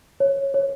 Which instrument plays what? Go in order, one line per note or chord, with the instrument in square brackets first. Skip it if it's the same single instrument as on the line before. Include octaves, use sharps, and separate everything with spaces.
[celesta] C#5
C#5